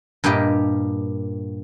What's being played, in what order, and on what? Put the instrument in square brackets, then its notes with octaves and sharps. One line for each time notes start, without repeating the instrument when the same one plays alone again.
[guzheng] G2 A#2 A#3 G4 D#5